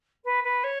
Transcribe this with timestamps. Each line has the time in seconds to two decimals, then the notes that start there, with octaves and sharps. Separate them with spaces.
0.24 B4
0.43 B4
0.63 C#5